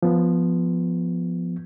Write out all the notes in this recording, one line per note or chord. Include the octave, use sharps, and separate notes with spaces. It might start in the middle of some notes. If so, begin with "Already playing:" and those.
F3 B3